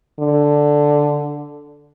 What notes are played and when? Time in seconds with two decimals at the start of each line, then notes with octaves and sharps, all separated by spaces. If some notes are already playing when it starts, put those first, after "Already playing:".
0.20 D3